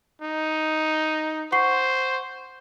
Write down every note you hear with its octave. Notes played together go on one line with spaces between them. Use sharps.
D#4
C5 F#5 C#6 C7